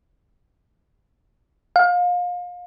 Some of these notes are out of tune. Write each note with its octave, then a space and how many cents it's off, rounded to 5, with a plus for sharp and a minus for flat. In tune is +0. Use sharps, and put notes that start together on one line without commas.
F5 +30